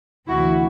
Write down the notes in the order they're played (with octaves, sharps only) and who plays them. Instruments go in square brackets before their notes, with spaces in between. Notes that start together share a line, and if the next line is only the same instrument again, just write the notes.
[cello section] D2 C3 E3 E4 F#4